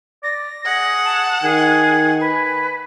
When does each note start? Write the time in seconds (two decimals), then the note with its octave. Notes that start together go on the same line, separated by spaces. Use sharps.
0.23 D5 A#6
0.66 G#4 F#5
1.04 A5
1.43 D#3 G#4 G#5
2.20 B4